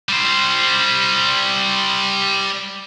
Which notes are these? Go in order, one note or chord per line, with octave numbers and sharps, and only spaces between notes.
G3 C5